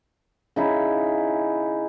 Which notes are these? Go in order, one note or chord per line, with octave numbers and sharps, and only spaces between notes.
C#3 D#4 E4